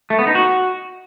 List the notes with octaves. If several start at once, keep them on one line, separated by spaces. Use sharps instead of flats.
A3
B3
D#4
F#4